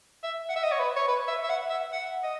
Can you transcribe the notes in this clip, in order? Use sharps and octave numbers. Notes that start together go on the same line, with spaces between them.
E5
F#5
E5
D#5
C#5
B4
C#5
B4
E5
E5
F#5
E5
F#5
D#5